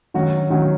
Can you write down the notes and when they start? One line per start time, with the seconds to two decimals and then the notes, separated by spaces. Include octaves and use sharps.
0.14 D#3 F#3 C#4 F#4
0.50 D#3 F#3 C#4 F#4